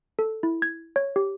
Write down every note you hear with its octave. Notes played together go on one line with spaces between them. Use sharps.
A4
E4
G#6
C#5
G4